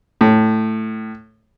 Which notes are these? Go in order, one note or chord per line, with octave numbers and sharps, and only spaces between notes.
A2